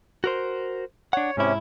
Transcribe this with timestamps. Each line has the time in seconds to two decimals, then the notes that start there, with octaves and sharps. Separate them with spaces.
0.24 F#4 A#4 C5
1.13 D4 C#5 F#5
1.37 G#2 C3 C#4 E4